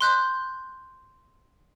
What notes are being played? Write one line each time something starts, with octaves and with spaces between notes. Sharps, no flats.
C6 F#6 G6